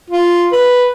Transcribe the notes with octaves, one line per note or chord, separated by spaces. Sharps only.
F4
B4